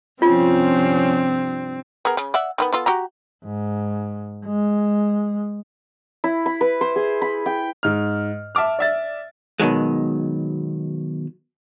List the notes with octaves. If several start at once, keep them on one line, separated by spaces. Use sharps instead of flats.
G2 C3 F3 C4 C#4 F4
B3 G#4 A#4
C#3
D5 E5 F#5
D#3 G#3 B3
B3 F4 A4
F#4 G4 A#5
G#2
G#3
E4
B5
B4
C5
G#4
B5
G5
G#2 F6
E5 A5 D6 F6
D5 E5 A6
B2 D#3 F#3 G#3